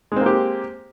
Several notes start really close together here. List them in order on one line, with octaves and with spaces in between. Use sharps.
G#3 C4 A#3 G4